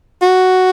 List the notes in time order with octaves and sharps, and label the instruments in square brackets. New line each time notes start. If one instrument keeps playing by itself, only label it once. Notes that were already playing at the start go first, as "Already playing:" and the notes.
[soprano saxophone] F#4